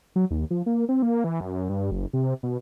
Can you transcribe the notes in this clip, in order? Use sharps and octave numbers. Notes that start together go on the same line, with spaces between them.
F#3
D#2
F3
A#3
C4
A#3
E3
F#2
G2
F#1
C3
B2